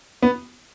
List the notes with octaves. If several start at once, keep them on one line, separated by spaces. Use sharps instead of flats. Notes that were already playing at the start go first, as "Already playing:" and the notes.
B3